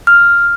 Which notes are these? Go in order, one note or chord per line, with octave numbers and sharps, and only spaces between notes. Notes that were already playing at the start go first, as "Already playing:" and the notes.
F6